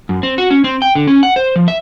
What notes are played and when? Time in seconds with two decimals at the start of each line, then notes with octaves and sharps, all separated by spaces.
0.09 F#2
0.23 C4
0.38 F#4
0.50 C#4
0.64 C4
0.82 G5
0.95 D3
1.07 C#4
1.23 F#5
1.36 C5
1.56 F3
1.68 E5